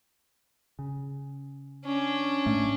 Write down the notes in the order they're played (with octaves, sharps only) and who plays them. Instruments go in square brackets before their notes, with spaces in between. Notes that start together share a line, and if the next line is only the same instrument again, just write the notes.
[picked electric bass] C#3
[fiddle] C#4 D4
[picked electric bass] A2 A3